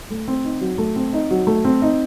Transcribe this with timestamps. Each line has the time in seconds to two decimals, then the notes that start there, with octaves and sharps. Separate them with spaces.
0.10 A3
0.28 C4
0.44 D#4
0.61 F#3
0.78 A3
0.96 C4
1.13 D#4
1.31 F#3
1.47 A3
1.65 C4
1.82 D#4